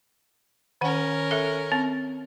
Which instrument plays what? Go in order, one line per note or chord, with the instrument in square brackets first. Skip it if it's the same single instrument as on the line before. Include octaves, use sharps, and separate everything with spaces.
[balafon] D#3 F#5 [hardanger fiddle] C#4 A#4
[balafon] A4 E5
C4